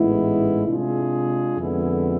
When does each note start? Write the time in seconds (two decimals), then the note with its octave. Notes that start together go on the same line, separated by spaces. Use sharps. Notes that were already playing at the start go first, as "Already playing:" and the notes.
Already playing: A1 G#2 G#3 B3 E4
0.66 C3 G#3 D4 F4 G#4
1.57 F2 D3 G#3 B3 E4